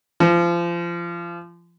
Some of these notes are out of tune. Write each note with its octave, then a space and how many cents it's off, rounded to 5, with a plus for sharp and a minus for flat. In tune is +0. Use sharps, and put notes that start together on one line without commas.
F3 -25